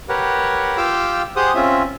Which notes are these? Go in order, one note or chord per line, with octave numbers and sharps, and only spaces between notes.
G4 A#4 B4 C#5 F#5
F4 G4 F5 G5 D6 E6
G4 G#4 C5 F#5 D#6
C4 C#4 F4 E5